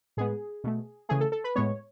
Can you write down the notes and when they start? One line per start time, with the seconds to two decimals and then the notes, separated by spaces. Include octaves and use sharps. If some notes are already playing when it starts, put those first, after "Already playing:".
0.17 A2 G#3 B3 G#4
0.64 B2 A3
1.09 C#3 E3 A3 G#4
1.20 A4
1.32 A4
1.44 B4
1.56 A2 G#3 B3 C#5